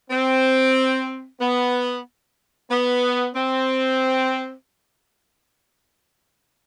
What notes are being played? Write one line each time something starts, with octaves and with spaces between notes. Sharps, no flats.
C4
B3
B3
C4